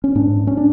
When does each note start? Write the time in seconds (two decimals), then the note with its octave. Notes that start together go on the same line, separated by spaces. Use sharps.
0.04 C#4
0.15 G#2 D4
0.47 C#4
0.57 D4